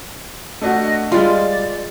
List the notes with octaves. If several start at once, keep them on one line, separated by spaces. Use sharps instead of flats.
A3 D4 F#4 D#5
G3 G#3 F4 D5